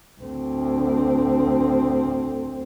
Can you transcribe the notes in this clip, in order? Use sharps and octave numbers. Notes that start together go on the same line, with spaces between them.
D2 C4